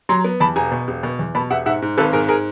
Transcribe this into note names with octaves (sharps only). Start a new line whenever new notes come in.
F#3 A#5 C6
B3
E2 A5 B5
E1 G#5 A#5
B2
E1
B2
E2
B2 A5 B5
E1 E5 F#5
G#2 E5 F#5
G#2
G#1 A4 B4
G#2 G#4 A#4
G#4 A#4